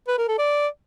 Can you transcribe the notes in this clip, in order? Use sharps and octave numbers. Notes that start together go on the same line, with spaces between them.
B4
A#4
A4
D5